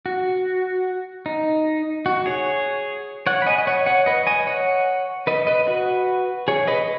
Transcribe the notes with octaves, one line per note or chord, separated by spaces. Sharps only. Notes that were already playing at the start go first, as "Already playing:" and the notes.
F#4
D#4
F#4
G#4 C#5
C#5 F#5
B5
D#5 G#5
D#5
C#5 F#5
C#5 F#5
B4 D#5
D#5 G#5
C#5 F#5
B4 D#5
B4 D#5
F#4 B4
G#4 C#5
B4 D#5